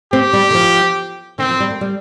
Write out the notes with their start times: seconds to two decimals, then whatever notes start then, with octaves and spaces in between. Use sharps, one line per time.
0.13 C4 G4
0.33 G3
0.50 D#3
0.55 F3
1.39 D#3 C4
1.49 F3
1.60 G3
1.70 A#3
1.81 G3